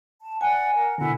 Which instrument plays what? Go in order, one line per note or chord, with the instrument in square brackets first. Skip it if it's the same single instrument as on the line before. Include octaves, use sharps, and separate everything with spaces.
[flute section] A5
[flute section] D5 F#5 [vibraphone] G#5
[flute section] A#4 F#5
[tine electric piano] B2 D3 [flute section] E4 F#5 G#5